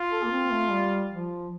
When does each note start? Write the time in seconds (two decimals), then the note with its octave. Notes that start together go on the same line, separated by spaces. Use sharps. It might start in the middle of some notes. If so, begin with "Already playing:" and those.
Already playing: F4
0.11 A4
0.24 A#3
0.32 C4
0.51 A3
0.71 G3
1.12 F3